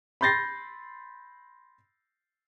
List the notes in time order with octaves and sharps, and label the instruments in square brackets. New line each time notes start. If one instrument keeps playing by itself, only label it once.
[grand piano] B5 C6 G6 A6 A#6 C7